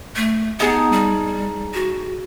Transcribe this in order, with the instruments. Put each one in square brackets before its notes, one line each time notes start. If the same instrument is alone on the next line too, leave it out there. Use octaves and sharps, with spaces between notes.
[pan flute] A3
[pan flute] B3 [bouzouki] D#4 G#4 A5
[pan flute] G3
F#4